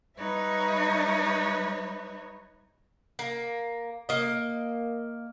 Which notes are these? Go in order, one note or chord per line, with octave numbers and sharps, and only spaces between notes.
G3 D#4 B4 C#5 E5
A#3
A#3 D#5